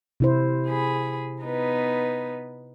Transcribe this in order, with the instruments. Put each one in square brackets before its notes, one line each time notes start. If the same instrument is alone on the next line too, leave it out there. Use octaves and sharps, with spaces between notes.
[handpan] C3 E4 C5
[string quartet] G#4 B5
B3 D#4 B4